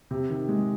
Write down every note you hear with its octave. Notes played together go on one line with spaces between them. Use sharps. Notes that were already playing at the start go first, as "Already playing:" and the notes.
C3
D#3
G#3